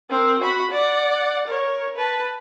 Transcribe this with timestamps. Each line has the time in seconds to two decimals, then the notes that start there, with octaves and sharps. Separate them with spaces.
0.10 C4 A#4
0.39 F#4 B5
0.71 D5 F#5
1.47 A#4 C#5
1.96 B4 A5